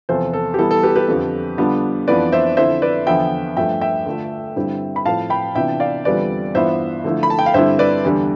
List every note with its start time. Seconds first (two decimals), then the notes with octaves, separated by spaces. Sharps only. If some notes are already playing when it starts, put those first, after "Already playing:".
0.09 E2 C3 F3 A4 C5
0.33 A4
0.54 G4
0.59 E3 G3 B3 E4 A4
0.71 A4
0.83 G4 B4
0.95 G4 B4
1.08 F2 D3 F3
1.57 D3 G3 B3 D4 F4
2.08 F2 E3 B3 D4 F4 B4 D5
2.32 C5 E5
2.57 D3 F3 C4 E4 C5 E5
2.82 B4 D5
3.07 E2 D3 F3 B3 E5 G5
3.57 G2 F3 A3 E5 G5
3.81 E5 G5
4.06 D3 A3 D4 F4
4.56 G2 D3 G3 C4 E4
4.96 B5
5.05 A2 F3 C4 F4 F5 A5
5.30 G5 B5
5.55 C3 E3 B3 D4 F4 E5 G5
5.80 D5 F5
6.05 E2 D3 G3 C4 F4 B4 D5
6.55 G2 E3 B3 F4 C5 E5
7.04 D3 F3 A3 E4
7.23 B5
7.30 A5
7.39 G5
7.46 F5
7.54 G2 D3 G3 C4 E4 C5 E5
7.79 B4 D5
8.04 E2 D3 G3 D4